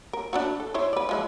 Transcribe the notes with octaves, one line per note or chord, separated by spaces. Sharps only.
A#4
D4 E4 F#4
A4
E4 C5 C#5
B4 D5
F3 G#3 E4